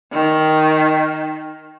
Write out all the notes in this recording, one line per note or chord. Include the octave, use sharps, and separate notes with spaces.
D#3